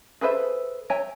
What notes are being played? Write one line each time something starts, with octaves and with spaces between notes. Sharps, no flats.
G#4 A4 B4 C5 E5
C#5 E5 G5 G#5 A#5